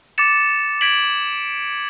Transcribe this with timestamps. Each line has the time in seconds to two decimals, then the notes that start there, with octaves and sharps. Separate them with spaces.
0.18 D6 A6 C#7 E7
0.81 G#6 B6 D7 F#7